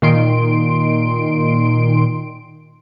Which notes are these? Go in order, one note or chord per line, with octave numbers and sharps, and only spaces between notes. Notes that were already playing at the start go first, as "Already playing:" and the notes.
A#2 D#3 C6 D7